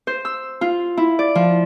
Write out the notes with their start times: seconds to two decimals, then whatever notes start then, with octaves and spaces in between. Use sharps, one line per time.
0.07 C5
0.25 E6
0.61 F4
0.97 E4
1.19 D5
1.35 F3